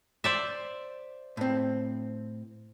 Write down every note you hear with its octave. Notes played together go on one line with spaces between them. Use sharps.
C5 D5 E5
A2 C4